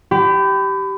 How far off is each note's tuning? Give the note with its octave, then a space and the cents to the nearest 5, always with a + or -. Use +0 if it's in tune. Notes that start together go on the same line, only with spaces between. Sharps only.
G4 -15 B5 +30